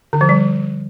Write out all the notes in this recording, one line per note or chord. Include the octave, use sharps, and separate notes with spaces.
D3
F3
G3